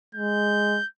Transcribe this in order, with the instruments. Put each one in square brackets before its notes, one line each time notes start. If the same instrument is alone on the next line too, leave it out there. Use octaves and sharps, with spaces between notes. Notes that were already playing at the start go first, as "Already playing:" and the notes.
[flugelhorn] G#3 [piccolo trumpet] G6